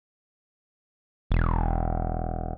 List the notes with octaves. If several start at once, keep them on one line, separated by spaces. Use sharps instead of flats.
E1